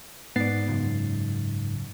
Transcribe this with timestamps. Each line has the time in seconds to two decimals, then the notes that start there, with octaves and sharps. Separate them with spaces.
0.36 G#2 B3 D5 A6 C7
0.68 C#2 F#2